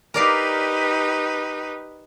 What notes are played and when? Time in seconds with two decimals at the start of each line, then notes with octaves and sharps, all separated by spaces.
0.14 D#4 G4 A#4 B4 D5 F5